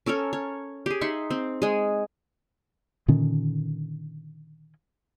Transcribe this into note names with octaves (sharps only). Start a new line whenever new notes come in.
C#4 A4 A#4 C#5
C#5
G4 G#4
D#4 E5 F#5 C6
C4
G#3 G#4
A#2 D3 D#3 C#4